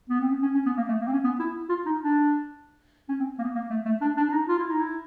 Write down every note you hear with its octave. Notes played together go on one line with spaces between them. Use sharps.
B3
C4
C#4
C#4
C#4
B3
A#3
A3
A#3
C4
C#4
B3
E4
F4
D#4
D4
C#4
C4
A#3
B3
A#3
A3
A3
D4
D4
D4
D#4
F4
E4
D#4
E4